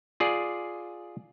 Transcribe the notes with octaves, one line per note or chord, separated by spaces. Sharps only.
F4 G#4 D5